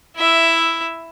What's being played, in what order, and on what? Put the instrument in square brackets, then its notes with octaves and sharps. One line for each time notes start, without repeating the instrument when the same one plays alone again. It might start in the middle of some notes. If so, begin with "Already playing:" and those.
[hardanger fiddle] E4 E5